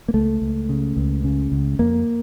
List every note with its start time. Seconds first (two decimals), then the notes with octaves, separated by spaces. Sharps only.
0.08 A#3
0.14 C#2 A3
0.42 C#2
0.69 C#3
0.97 C#2
1.24 C#3
1.52 C#2
1.79 F2 A#3